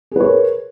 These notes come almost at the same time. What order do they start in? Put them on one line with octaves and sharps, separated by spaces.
G#4 B4 C#5 A#4